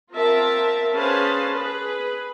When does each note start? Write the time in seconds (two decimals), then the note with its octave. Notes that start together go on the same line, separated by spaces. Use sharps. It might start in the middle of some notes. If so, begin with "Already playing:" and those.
0.12 C4 F4 A#4 E5 A5
0.94 C#4 G#4 B4 C5 F5 A5
1.54 G#4 B4